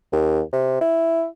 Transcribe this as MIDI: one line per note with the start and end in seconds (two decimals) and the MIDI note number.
0.12 0.41 39
0.53 0.80 48
0.81 1.25 64